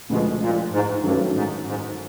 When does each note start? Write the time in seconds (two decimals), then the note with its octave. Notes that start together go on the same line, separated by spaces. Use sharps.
0.09 D2 B2 D3 F3 G#3
0.41 A#2
0.71 G#2
1.03 G2 D#3 F#3 A3 C#4
1.34 G#2
1.66 G#2